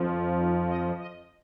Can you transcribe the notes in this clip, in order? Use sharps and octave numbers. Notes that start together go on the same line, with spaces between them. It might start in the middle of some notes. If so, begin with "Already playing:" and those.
Already playing: F2 F3
D#4
D#5
D#5